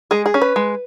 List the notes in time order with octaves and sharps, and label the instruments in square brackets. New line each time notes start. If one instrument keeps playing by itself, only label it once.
[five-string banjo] G#3 G#4
G#4
C#4
B4
G#3